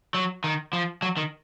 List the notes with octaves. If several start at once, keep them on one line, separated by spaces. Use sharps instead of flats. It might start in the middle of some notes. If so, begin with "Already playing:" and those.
F#3
D#3
F3
F#3
D#3